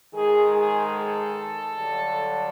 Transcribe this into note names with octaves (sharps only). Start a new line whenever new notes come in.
G#2 D#3 G#3 G#4
G#4
A4
G2 D3 F#3